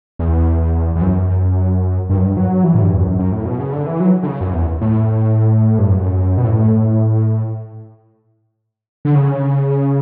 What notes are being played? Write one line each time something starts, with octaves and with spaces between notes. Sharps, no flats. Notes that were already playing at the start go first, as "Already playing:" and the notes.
E2
E2
F#2
G2
F#2
G2
F#3
E3
A2
G2
E2
F#2
F#2
A2
B2
C#3
D3
E3
F#3
D3
C#3
F#2
E2
A2
G2
F#2
B2
A2
D3
C#3